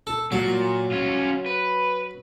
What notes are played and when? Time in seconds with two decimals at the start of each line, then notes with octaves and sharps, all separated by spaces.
0.07 A4
0.32 A#2 F#3
0.92 C#4 F4
1.46 B4